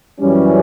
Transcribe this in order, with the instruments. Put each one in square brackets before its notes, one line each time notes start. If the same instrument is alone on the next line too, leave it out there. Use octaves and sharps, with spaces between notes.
[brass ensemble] F#2 E3 G3 C#4